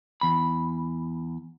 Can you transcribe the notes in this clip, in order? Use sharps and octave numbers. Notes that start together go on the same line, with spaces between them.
E2 B5